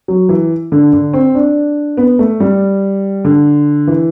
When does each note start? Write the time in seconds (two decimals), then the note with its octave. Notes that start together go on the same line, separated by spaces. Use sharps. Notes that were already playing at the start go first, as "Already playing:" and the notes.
0.08 F#3
0.29 E3
0.72 D3
0.93 D3
1.13 C4
1.35 D4
1.97 B3
2.19 A3
2.40 G3
3.25 D3
3.87 E3